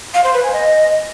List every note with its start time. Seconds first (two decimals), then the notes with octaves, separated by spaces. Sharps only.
0.14 F5
0.24 C5
0.33 B4
0.43 G#5
0.53 D#5